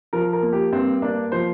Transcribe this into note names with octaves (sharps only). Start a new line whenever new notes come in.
F3 A#4
A#4
A#3
G4
G2 C4
A#3 D4
F3 C5